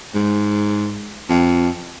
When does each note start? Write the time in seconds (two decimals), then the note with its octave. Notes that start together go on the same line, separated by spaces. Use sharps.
0.15 G#2
1.29 F2